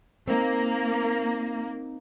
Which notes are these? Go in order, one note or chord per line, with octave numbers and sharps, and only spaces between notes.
A#3 C4 D#4